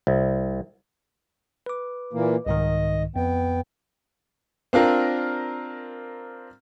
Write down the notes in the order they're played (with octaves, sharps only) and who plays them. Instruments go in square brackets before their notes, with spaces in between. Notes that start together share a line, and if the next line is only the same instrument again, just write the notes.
[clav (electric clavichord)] C2
[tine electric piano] B4 D6
[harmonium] A#2 E3 A#3
[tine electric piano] C2 G#2 D#3 [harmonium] D#5
[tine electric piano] F2 [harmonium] B3 G5
[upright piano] C4 D4 F4 A#4